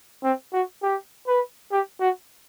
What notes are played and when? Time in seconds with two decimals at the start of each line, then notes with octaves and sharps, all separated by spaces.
0.24 C4
0.53 F#4
0.82 G4
1.27 B4
1.72 G4
2.01 F#4